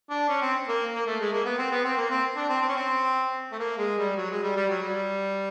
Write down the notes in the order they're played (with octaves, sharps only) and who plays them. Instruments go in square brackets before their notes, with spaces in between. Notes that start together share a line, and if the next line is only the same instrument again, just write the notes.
[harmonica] D4
C#4
C4
A#3
A#3
A3
G#3
A#3
B3
C4
B3
C4
A#3
C4
D4
C4
C4
C#4
C4
A3
A#3
G#3
G3
F#3
G#3
G3
G3
F#3
G3